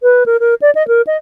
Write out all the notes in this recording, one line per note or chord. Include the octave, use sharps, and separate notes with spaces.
B4
A#4
A#4
D5
D#5
A#4
D#5